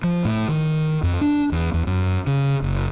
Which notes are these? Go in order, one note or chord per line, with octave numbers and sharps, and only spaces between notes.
F3
A2
D#3
F2
D4
E2
E2
F#2
C#3
F#1